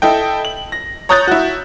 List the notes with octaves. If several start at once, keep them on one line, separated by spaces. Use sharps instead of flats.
E4 A4 D#5 G5
F#7
A#6
C#5 A#5 D#6 F#6 G6 A6
E4 F#4